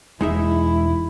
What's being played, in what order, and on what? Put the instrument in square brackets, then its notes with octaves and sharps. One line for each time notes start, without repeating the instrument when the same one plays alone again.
[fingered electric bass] E1 [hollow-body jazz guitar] G#3 D#4 E5 [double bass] E4